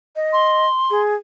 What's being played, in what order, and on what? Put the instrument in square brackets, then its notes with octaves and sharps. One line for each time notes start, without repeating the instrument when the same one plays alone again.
[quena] D#5
[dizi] C6
[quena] G#4